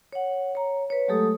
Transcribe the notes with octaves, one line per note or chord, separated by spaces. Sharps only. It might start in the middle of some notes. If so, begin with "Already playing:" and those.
C#5 F#5
C#5 A#5
B4 C#5
F#3 G#3 A3 G4 A4 D#6